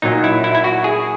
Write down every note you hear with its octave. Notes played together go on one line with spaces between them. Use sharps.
A#2 F#3 D#4
E4
E4
E4
F#4
G#4